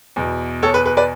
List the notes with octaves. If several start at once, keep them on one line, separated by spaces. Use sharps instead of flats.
E2 B2
A4 C#5
B4
B4
B4 D5